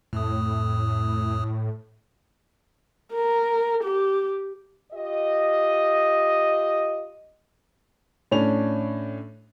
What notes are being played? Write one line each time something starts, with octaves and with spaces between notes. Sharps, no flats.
F2 A2 D#6
A#4
G4
F4 G4 D#5
A2 C#4 D4 F7